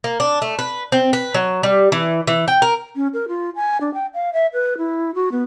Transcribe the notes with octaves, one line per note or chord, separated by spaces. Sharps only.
A#3
D4
A3
B4
C4
B4
F#3
G3
E3
E3
G5
A#4
C#4
A#4
F4
G#5
D4
G5
F5
E5
B4
E4
F#4
B3